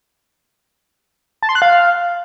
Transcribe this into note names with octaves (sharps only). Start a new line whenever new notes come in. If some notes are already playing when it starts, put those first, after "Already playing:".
A5
C6
F#6
F5